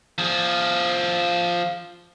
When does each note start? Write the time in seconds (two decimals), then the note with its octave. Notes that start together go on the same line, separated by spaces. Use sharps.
0.18 F3 G#4